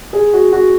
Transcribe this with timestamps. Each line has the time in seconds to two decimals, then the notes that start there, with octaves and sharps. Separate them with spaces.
0.13 G#4
0.33 F#4
0.52 F#4